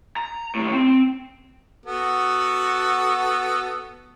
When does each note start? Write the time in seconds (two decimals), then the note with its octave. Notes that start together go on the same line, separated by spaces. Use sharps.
0.16 A#5
0.55 D#2 A2
0.74 C4
1.86 B3 F#4 A4